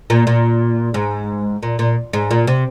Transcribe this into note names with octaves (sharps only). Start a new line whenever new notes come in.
A#2
A#2
G#2
A#2
A#2
G#2
A#2
C3